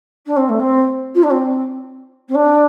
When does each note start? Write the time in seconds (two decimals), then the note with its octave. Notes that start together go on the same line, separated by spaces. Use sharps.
0.26 D4
0.36 C4
0.49 A3
0.59 C4
1.14 F4
1.23 D4
1.30 C4
2.28 C4
2.34 D4